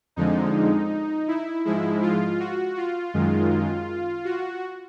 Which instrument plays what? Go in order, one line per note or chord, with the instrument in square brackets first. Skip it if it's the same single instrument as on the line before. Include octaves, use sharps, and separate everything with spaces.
[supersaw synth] F2 D3 F3 G#3 D#4
E4
G#2 F3 G#3 E4
F4
F#4
F4
F#2 D#3 G#3
F#4